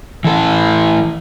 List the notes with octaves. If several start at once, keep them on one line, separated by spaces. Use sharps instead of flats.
E3 A4